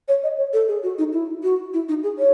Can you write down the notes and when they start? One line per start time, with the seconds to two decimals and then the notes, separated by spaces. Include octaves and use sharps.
0.08 C#5
0.23 D#5
0.38 C#5
0.53 A4
0.68 G#4
0.83 F#4
0.98 D#4
1.13 E4
1.43 F#4
1.74 E4
1.89 D#4
2.03 G#4
2.19 C#5